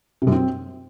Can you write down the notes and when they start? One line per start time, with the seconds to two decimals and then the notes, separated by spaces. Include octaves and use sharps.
0.22 C3
0.27 F#2
0.32 C4